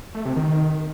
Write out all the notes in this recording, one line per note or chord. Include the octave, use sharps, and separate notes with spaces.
A3
C3
D#3